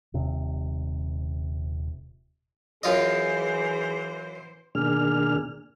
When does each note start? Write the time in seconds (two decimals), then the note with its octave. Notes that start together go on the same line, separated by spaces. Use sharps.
0.14 D#1 C3
2.83 F#2 E3 F4 G#4 C5 D#5
4.75 B2 D#3 A#3 D4 G#4 F6